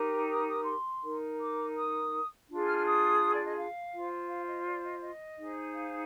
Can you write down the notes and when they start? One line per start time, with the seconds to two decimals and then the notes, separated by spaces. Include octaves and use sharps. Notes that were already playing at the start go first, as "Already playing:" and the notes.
Already playing: D#4 G4 A#4
0.30 D#6
0.48 D#6
0.66 C6
1.03 D#4 A#4
1.40 D6
1.76 D#6
2.48 D4 F4 G#4
2.67 F6
2.77 F6
2.84 D#6
3.33 D5
3.46 D#5
3.57 F5
3.94 F4 C5
4.29 F5
4.48 D#5
4.66 D5
4.84 D#5
5.02 D#5
5.38 D#4 G#4 C5
5.74 F5